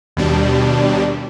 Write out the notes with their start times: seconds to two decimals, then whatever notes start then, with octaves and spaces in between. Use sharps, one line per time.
0.17 D#2 B2 G3 D4